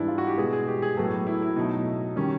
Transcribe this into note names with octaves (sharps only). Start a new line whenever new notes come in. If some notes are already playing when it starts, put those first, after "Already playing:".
Already playing: G#2 E3 G3 B3 D4 E4
F4
F#4
G4
B2 G#3 B3 G#4
G#4
G4
G#4
A2 F#3 B3 A4
E4
E4
B2 F#3 A3 D#4
D#3 G3 C#4